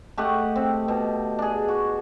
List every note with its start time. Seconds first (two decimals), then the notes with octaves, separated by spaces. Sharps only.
0.17 A3 G4 D#5 F#5
0.56 C4
0.88 B2
1.39 D4 G#4
1.68 F#4